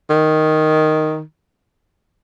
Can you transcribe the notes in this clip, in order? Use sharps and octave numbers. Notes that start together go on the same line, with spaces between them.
D#3